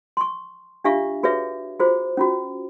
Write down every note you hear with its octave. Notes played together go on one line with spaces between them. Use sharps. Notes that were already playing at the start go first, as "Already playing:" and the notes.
C6 C#6
D4 F4 G4 E5 F5 C#6
F#4 G#4 B4 C#5 E5
F4 F#4 G#4 C5
C#4 F4 F#4